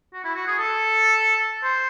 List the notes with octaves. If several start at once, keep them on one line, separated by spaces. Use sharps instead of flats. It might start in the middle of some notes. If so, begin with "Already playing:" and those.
F#4
E4
F#4
G#4
A4
C5